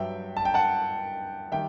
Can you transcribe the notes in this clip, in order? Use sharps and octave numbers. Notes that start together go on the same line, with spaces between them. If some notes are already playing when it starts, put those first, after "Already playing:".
Already playing: G2 F#3 E5 G5
A5
G5
F#5 A5
D#3 G3 E5 G5